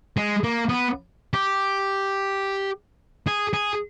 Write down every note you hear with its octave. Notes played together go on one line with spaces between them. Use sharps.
G#3
A#3
B3
G4
G#4
G#4